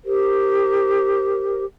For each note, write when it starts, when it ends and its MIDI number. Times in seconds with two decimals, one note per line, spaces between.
0.04 1.63 67
0.04 1.63 70
0.04 1.63 72